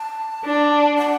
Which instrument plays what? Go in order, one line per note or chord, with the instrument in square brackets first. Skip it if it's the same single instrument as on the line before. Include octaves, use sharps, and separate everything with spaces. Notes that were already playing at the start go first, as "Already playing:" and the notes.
Already playing: [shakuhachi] A5
[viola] D4
[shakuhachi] F#5